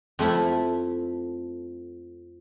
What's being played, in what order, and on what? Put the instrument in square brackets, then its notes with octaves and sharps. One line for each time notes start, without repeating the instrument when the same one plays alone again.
[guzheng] F2 A3 E4 B5